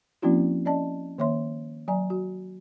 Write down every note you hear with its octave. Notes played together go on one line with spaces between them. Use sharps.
F3 A#3 C4 C#4 E4 F#4
C#4 D5 D#5 A5
D#3 A#3 C#5 E5 C6
F#3 D5 G#5 A#5
F#4